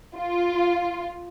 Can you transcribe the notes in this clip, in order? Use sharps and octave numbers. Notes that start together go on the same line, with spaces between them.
F4